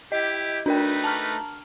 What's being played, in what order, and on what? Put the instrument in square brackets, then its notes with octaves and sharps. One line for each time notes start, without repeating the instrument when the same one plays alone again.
[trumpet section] E4 G4 [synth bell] D#5
[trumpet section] A3 D#4 B4 [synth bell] D4 A#4 G5
[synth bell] A5 A#5 F6